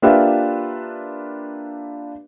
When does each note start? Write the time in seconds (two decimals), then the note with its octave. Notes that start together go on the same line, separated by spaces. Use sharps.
0.02 A#3 D4 F4 G4 B4 E5